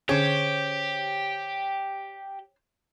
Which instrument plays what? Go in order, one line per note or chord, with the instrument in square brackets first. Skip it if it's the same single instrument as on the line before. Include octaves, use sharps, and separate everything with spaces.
[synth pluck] D3 C#4 G#4 [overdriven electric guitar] G4 [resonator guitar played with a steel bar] C5 C#5